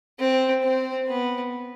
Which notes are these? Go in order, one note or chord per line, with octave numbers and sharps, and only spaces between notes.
C4
C4
B3